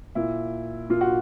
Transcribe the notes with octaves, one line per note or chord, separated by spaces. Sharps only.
A#2 E4
A#2 F4
F#4